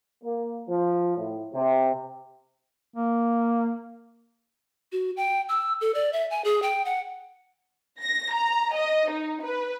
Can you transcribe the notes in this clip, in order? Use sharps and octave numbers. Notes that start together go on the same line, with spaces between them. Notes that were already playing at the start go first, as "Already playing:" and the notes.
A#3
F3
A2
C3
A#3
F#4
G5
E6
A4
D5
E5
G#5
G#4
G5
F#5
A#6
A#5
D#5
D#4
B4